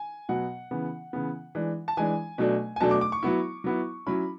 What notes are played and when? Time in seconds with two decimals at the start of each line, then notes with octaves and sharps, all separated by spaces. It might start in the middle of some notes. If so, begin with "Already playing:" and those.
Already playing: G#5
0.29 B2 F#3 B3 F#5
0.71 C#3 E3 B3
1.13 C#3 E3 B3
1.55 E3 G#3 D4
1.88 A5
1.97 E3 G#3 D4 G#5
2.38 B2 F#3 A3 D4
2.76 G#5
2.80 B2 F#3 A3 D4 A5
2.91 D6
3.01 D6
3.12 C#6
3.23 F#3 B3 E4
3.64 F#3 B3 E4
4.07 F#3 C#4 E4 B5